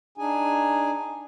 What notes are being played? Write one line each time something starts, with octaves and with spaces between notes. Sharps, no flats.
D4 D#4 G#4 G#5